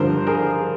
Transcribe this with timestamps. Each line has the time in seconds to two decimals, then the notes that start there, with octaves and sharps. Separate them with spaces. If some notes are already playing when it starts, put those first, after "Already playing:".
Already playing: G2 D3 F3 A#4 C5
0.27 G#4 A#4